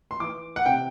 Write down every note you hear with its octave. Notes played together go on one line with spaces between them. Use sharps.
C6
E3 D6
F#5
C3 G5